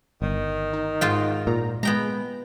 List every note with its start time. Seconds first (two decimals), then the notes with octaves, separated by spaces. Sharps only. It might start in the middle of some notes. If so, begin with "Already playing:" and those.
0.22 G1 D#3
0.73 D#4
1.01 G#2 F4 G5
1.47 A#2 A#5
1.83 G#3 B3 G5 A#5